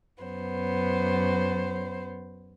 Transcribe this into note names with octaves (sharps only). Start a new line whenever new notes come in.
F#2 B3 C5